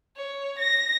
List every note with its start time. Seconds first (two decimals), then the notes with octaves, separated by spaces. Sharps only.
0.16 C#5
0.58 A#6